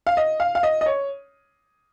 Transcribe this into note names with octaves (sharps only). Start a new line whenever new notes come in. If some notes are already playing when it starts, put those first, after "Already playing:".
F5
D#5
F5
F5
D#5
D#5
C#5